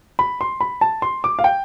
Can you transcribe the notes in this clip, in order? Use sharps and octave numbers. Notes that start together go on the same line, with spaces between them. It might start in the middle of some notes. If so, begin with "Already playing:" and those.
B5
C6
B5
A5
C6
D6
F5
G5